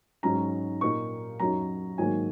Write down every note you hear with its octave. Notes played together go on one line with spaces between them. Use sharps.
G#2 F#3 C#4 A#5
A#2 A#3 D#4 C#6
F#2 F#3 D#4 A#5
G#2 D#3 F#3 A#3 G#5